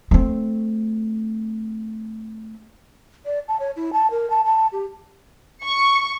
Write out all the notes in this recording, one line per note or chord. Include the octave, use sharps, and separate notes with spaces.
A3 C4
D5
A5
C#5
E4
A5
A#4
A5
A5
G4
C#6